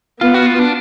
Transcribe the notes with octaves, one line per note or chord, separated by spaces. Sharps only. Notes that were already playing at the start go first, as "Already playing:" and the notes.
B3 F4
F#4
F4
D4